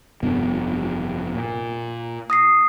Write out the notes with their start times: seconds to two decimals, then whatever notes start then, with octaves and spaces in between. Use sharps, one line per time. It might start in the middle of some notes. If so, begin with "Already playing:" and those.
0.22 F1 G2 B3
1.35 A#2
2.30 D#6 A#6 C7